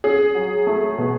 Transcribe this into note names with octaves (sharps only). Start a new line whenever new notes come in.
C#4 G#4
F#3
A3
B2